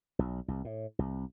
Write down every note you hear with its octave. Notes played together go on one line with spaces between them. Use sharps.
B1
C2
A2
C2